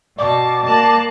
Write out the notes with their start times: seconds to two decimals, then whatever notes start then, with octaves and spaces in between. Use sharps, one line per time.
0.18 B2 D5 G5 A5 C#6 D6
0.66 A#3 A5 F#6